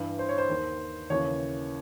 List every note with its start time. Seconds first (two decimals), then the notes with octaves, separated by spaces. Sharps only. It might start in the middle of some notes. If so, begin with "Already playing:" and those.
Already playing: G2 E3
0.19 C5
0.29 C#5
0.38 C5
0.49 D#2 D#3
1.10 D#2 C#3 E3 C#5